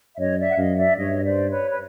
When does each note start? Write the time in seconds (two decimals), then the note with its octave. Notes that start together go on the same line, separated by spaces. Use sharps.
0.14 E5
0.18 F#2 C#5 D#5
0.38 D5 E5
0.50 F#5
0.58 F#2 D#5 F5
0.78 D5 E5
0.98 G2 C#5 D#5
1.24 C5 D5
1.51 B4 C#5
1.71 B4